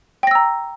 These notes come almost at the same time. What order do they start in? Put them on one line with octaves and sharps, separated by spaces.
G5 A#6 E6 A#5